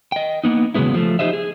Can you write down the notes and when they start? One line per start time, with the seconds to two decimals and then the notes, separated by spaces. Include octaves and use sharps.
0.12 D#5 G5
0.44 A#3 B3 D#4
0.74 E2 C#3 F#3 G#3 B3 E4
0.94 F3 A3
1.19 D#4 G4 C5 D#5 E5
1.33 G#4